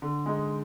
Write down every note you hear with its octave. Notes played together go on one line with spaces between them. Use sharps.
D3
G#3 D#4